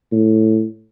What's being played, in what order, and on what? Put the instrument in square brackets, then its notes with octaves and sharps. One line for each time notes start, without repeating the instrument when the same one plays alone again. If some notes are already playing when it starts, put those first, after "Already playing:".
[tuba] A2